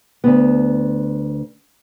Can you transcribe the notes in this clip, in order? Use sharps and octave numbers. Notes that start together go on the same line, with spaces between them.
D2 B3